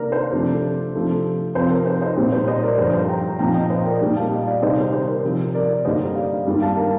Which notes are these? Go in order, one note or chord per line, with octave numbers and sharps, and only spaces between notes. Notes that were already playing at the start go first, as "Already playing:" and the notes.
Already playing: C3 D#3 A#3 D4 A#4 D5 A#5
C5
C3 F3 A3 D4
C3 F3 A3 D4
C3 F3 C4 C5
A#4
C5
C5 D#5
A#2 G3 C4 C5
C5
C5 D#5
A#4 D5
G2 D3 F3 C5
C5
G5 A#5
A#2 F3 C4 G5 A#5
D#5 G5
C5 D#5
A#4 D5
A#2 G3 A#3
F5 A5
D#5 G5
D5 F5
C3 D#3 G3 C4 C5 D#5
C5
C5
A#4
C3 F3 C4
A#4 D5
G2 D3 G3 A#3 C5 D#5
D5 F5
G2 D#3 G3 A#3
F5 A5
A#4